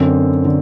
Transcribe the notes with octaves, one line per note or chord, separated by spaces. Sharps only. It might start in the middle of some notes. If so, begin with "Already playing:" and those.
Already playing: F#2 D3 C4
D3